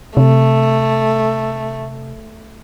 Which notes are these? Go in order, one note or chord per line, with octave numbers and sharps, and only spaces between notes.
C3 A3